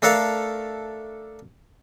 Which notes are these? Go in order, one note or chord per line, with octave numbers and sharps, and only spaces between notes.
A3 D4 A4 A#4 F5